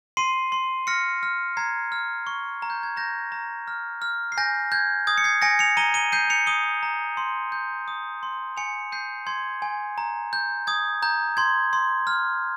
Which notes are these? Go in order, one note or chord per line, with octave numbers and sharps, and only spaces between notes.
C6 C7 D#7
C6
F6 A#6 C#7
F6
A#5 G#6 C7
F6
C#6
A#5
G6
G#6
A#5 G6 A#6
A#5
F6
F6
C7
G#5 G6 A#6
G6 G#6
D#6 G#6
C#7
G#6 C7
G#5 A#6 C#7
C#7 F7
A#5 D#7 G7
D#7 G7
G6 C7 D#7
C#7 F7
D#6 D#7 G7
A#5
C6
G6
D#6
C6
G#5 C#7 F7
G6 C7 D#7
C6 G#6
G#5
A#5
G6
D#6 G#6
A#5 G6
C6 G#6
C6
F6